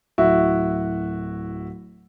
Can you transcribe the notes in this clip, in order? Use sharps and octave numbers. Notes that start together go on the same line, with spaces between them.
D1 E4 F#4